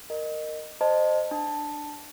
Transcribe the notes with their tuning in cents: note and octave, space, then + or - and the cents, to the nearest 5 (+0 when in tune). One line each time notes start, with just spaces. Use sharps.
A#4 -5 D#5 -20
C5 +0 D#5 -20 A5 +5
D4 +10 A5 +0